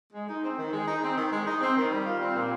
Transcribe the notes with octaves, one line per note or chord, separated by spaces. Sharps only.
G#3
D#4
C4
D#3
G#3
D#4
C4
D#3
G#3
D#4
C4
D#3
G3
F4
C4
A#2